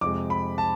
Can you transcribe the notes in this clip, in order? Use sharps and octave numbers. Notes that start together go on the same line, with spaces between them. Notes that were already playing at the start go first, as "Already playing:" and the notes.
F2 C3 G#3 D6
B5
A5